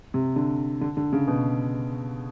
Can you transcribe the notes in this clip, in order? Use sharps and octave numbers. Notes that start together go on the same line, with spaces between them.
C3
D3
D3
D3
C#3
B2